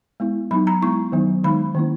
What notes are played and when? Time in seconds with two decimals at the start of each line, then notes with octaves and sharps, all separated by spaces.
0.20 G#3 B3 E4
0.51 F#3 B3 D#4 B5
0.67 A#5
0.82 G#3 B3 E4 C#6
1.12 D#3 F#3 B3 D#4
1.44 D#3 G#3 D#4 B5
1.75 D#3 A#3 C#4 E4